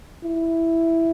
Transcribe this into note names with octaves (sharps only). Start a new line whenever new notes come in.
E4